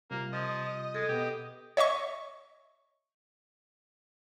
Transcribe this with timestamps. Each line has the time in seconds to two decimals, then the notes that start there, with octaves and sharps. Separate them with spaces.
0.11 C3 G3 A#3 F4
0.33 F3 D#5
0.94 G#3 A4
1.09 B2 B3 G4
1.77 C#5 D#5 E5 C#6